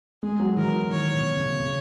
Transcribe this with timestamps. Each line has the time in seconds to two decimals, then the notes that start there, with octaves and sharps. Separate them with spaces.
0.23 G#3 G#4
0.40 F#3
0.57 E3 A#4
0.90 D#3 C#5
1.14 B2
1.36 C#3
1.60 C#3